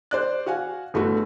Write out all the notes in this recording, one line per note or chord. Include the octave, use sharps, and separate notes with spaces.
C5 D5 F#6
F#4 F5 F#5 G#5
G1 A3 E4 F#4